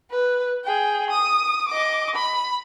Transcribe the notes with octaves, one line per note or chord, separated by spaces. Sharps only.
B4
G#4 G5
D#6
D#5 D6
B5